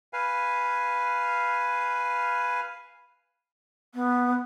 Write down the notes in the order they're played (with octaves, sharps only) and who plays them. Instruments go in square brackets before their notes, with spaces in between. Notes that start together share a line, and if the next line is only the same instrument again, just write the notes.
[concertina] B4 F5 G#5
[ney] B3